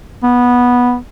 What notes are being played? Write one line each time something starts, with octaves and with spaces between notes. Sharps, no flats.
B3